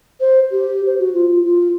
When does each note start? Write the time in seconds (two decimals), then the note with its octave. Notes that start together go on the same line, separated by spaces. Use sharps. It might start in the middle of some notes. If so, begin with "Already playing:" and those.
0.21 C5
0.51 G4
0.86 C5
0.99 F#4
1.14 F4
1.45 F4